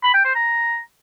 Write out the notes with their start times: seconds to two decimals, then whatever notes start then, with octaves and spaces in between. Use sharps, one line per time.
0.04 B5
0.14 G5
0.25 C5
0.35 A#5